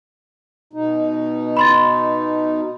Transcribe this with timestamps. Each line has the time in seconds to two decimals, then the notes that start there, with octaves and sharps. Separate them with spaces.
0.73 B2 D#4
1.57 B5 C6 A6